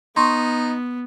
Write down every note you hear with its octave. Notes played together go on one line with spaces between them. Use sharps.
B3 D#4 C6 C#6